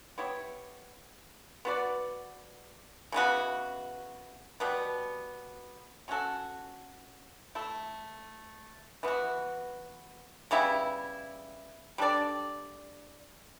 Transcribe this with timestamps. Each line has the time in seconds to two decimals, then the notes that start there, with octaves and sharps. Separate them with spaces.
0.18 B3 E4 G4 C#5
1.65 B3 F#4 B4 D5
3.12 C#3 E3 B3 F#4
4.60 B2 G3 B3
6.08 F#3 C#4 F#4 A4
7.55 A3 E4 A4
9.03 E3 B3 F#4
10.51 C#3 G3 B3 E4
11.98 G3 D4 A4 D5